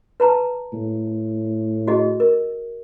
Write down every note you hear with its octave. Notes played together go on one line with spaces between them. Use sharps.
B4 A5 A#5
A2
F#4 G#4 D#5
A#4